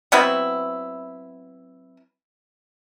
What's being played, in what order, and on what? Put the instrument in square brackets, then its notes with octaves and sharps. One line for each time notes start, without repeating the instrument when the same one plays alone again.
[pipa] F#3 B3 C4 E4